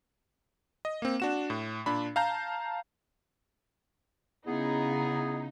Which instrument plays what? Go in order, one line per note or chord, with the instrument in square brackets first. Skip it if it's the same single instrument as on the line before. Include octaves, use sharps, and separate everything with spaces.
[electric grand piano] D#5
A#3 C4
D4 F#4 E7
A2
A#2 D4 B5
F5 A5 A#5 G6
[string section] C#3 D#4 [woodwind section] B3 E4 G#4